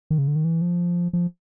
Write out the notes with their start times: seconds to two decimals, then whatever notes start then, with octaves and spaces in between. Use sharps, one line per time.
0.10 D#3
0.18 C#3
0.28 D3
0.36 D#3
0.45 E3
0.61 F3
1.13 F3